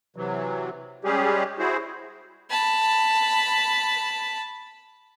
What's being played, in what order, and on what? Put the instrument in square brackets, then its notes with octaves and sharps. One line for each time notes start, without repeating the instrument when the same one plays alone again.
[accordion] C3 E3 F#3
G3 G#3 C#4 G4 G#4
E4 F#4 G#4 C5
[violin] A5 B5